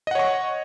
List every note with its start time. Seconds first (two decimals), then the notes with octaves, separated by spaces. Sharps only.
0.07 D#5
0.11 F#5
0.15 C#5
0.19 C#6